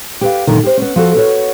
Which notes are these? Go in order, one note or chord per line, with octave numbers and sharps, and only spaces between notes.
G4 B4 F5
F#2 A#2 D3 D#3
G4 C5
B3 C#4
F3 F#4 A4
B3 F#4 C#5